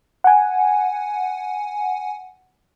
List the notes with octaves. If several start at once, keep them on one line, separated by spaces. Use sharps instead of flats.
F#5 G#5